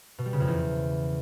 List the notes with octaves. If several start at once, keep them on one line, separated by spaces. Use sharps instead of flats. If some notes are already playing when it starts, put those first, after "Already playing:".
B2
G3
C#3
F2
E2